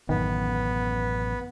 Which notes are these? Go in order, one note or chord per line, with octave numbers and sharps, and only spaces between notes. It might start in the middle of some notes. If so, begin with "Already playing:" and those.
A1 F#2 D#3 B3